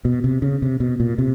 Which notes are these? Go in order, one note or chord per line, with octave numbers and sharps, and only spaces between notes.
B2
C3
C#3
C3
B2
A#2
C3